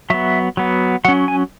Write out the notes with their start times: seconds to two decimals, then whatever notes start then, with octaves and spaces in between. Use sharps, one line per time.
0.10 F#3 B3 E5
0.57 F#3 B3
1.05 F#3 C#4 F#5
1.28 G#5